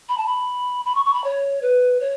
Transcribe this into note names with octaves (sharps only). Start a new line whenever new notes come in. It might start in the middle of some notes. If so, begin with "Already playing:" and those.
B5
A5
B5
B5
C#6
C#6
B5
C#5
B4
C#5